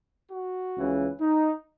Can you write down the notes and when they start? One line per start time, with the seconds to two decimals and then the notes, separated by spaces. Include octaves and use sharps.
0.31 F#4
0.76 C#2 C#3 E3
1.21 D#4